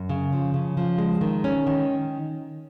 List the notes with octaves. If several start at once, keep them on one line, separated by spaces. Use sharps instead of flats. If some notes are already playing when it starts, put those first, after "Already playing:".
Already playing: F#2
C#3
F3
C#3
F3
G#3
D#3
C#4
D#3